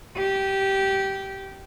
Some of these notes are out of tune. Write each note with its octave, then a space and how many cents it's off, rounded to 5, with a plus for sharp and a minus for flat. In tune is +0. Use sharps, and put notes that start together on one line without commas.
G4 -15